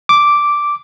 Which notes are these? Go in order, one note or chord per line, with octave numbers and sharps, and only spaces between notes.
D6